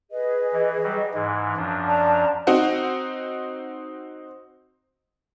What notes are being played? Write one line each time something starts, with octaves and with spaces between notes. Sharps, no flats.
G#4 B4 D#5
E3
F#3 G3
G#2 E3
F#2 F3 D4
D5 A5 A#5
C4 D#4 F#4